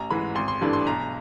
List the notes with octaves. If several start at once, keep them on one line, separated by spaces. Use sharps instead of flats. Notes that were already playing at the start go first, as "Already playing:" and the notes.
Already playing: A1 A#5
G#2 E3 G#3 B5
G#1 C6
C6
G2 E3 A3 D4
C6
B1 A#5